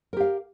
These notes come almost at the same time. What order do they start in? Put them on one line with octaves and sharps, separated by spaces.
A#4 G4 F5